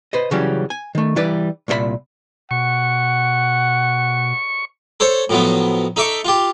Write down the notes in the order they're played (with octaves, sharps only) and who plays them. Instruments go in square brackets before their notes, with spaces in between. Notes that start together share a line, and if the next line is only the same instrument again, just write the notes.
[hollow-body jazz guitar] B4 C5 D#5
C#3 E3 F#3 G3 C#4 G4
G#5
D#3 A3
E3 G3 B4 D5
C2 A#2 F#4 E5 B5
[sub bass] B2 [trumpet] F#5 [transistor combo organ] C#6
[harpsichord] A4 C5 C#5
A2 F3 F#3 B3
D#4 A4 E5 C#6 D6
F4 G4